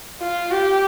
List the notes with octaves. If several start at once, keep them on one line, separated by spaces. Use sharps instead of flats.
F4
G4